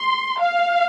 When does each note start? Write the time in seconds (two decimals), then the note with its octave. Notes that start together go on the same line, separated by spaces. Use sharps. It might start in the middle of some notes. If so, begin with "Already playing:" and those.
Already playing: C6
0.40 F5